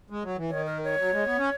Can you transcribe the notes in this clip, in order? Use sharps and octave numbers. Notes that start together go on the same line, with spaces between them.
G#3
F#3
E3
D#3 C#5
A#4
C#5
F#3
G#3
B3
C#4